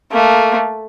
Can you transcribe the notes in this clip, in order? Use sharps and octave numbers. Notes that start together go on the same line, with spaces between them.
A3 A#3